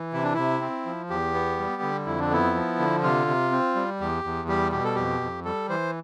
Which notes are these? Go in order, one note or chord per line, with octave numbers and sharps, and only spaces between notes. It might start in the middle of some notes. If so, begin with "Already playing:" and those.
Already playing: E3
C3 E4
D4
C3 E4
C4
F3
E2 G4
B3
G3
D3
F2 E4
D4
B3 E4
F3
D3
C3 F4
C3
C4
G3
E2 G4
E2
G3 G4
B2 G4
A4
F2 G4
F2
G3 A4
E3 C5